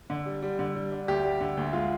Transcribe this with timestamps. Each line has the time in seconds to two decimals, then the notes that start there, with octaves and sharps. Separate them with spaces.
0.10 D3
0.26 G3
0.43 G3
0.59 D3
0.75 G3
0.92 D4
1.08 D2 G4
1.24 G3
1.41 D3
1.57 D2
1.73 G#3 F4